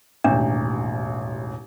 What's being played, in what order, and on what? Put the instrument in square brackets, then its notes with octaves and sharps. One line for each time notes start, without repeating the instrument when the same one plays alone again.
[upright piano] E1 A1 D#2 [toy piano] D4